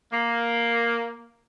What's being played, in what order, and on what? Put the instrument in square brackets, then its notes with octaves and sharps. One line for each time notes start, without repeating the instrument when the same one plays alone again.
[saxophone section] A#3